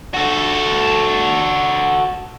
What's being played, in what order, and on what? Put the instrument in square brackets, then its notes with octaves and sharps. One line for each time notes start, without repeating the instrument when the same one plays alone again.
[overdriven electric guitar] F#4 A4